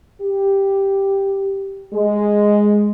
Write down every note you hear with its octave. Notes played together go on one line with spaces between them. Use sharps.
G4
G#3